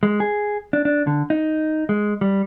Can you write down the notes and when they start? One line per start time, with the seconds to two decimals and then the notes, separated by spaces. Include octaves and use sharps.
0.03 G#3
0.20 G#4
0.73 D4
0.85 D4
1.07 D3
1.30 D#4
1.89 G#3
2.21 G3